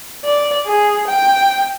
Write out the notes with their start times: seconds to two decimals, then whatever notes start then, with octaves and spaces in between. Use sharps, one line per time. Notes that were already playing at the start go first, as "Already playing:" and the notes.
0.25 D5
0.66 G#4
1.07 G5